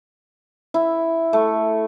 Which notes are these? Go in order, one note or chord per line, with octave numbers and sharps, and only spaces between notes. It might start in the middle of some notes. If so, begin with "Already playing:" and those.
E4
A3